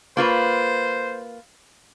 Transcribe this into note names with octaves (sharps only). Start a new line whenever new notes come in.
A#3 F4 B4 C5